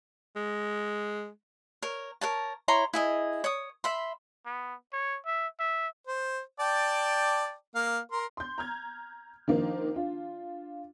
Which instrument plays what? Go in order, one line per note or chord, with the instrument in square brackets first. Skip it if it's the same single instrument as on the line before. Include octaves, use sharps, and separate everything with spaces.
[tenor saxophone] G#3
[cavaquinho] A#4 C#5
A#4 C#5 A5
E4 C#5 A#5 C6
E4 G#4 D#5
C#5 D#6
E5 B5 C6
[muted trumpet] B3
C#5
E5
E5
[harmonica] C5
D5 G5 A5
A#3 F5
A#4 C6
[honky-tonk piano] C6 G6
A#5 F6 G#6
D#3 F3 A#3 C4 D4 D#4
D4 F4